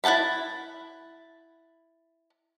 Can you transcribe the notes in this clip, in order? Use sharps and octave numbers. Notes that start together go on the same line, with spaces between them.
E4 F#5 G5 A5 B5